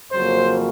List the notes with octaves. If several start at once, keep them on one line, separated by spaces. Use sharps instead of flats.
F2 C#3 F#3 A#3 C5